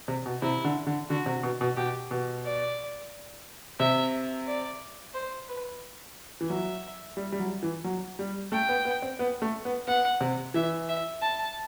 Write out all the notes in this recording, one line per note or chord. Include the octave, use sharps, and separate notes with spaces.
C3
B2
C3 E4
D3
D3
D3 F#4
C3
B2
B2
B2 G4
B2
D5
C3 E5
D5
C5
B4
E3
F#3 E5
G3
G3
F#3
E3
F#3
G3
A3 G5
B3
B3
C4
B3
A3
B3
B3 F#5
C3
E3 E5
E5
A5